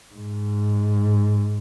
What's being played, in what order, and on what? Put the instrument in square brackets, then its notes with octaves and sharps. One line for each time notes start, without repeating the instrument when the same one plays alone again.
[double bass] G#2